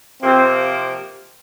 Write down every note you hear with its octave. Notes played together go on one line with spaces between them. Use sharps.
C3 F3 A#3 C4 F4 C5